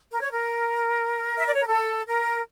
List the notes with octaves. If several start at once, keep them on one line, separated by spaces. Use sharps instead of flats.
A#4
C#5
A#4
E5
D5
C#5
A#4
A4
A#4